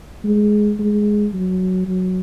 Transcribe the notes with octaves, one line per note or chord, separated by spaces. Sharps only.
G#3
G#3
F#3
F#3